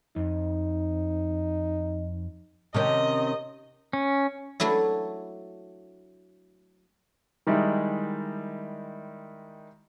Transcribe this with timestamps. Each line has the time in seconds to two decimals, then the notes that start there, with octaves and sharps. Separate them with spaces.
0.16 F2 D#4
2.74 C3 D#3 C#4 D#5
3.93 C#4
4.60 F#3 A3 D4 E4
7.47 D#3 G3 G#3 D#4 E4